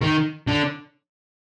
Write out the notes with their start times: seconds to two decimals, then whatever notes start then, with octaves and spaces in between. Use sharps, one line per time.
0.02 D#3
0.47 D3